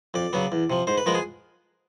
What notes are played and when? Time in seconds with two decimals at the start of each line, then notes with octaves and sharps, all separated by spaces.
0.14 F2 D5
0.33 C#3 F#3 B3
0.52 E2
0.70 C3 F3
0.87 G#2 C5
0.98 B4
1.06 F3 G#3 B3 A#4
1.15 G#4